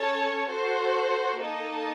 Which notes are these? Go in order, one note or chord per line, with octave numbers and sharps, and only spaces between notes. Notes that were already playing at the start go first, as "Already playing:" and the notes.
Already playing: C#4 A4 C#5 A5
F#4 A4 C5
A#3 D#4 A4 D#5 A5